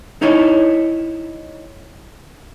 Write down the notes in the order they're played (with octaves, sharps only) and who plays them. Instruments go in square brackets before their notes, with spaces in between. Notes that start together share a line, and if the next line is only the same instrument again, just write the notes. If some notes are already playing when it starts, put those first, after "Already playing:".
[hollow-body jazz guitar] D#4 E4 C#5